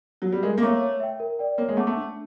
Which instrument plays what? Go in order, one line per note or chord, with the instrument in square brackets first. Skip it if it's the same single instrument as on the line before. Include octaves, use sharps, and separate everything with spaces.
[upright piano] F#3
G3
[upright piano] G#3 [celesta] A#4
[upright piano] A#3
[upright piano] A3 [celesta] C#5 F5 A#5 D6
[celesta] C#5
E5 G5
A#4
D5 G5
[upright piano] A#3 [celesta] C#5
[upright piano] G#3
[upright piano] A3 [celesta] F#5 A5 D6
[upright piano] A3
[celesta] D4